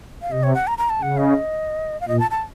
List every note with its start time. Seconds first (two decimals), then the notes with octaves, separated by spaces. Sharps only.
0.22 F5
0.32 C3 D#5
0.43 C#5
0.54 F#5
0.67 A#5
0.78 A#5
0.90 A5
1.02 C#3 F#5
1.19 D#5
2.01 F5
2.08 A#2 D#5
2.20 A5
2.31 A5